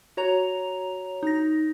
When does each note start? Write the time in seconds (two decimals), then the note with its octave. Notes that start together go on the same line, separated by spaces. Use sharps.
0.17 F#4 C#5 A#5 F7
1.23 D#4 A#6